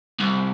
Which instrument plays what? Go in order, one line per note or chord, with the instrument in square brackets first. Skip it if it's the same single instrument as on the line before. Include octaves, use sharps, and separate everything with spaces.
[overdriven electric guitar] C2